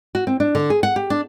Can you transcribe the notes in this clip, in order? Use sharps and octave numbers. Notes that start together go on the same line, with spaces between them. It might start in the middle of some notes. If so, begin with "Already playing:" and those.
F#4
C4
D4
D3
G#4
F#5
G4
D4